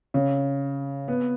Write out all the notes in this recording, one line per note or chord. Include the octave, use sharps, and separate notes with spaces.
C#3
B3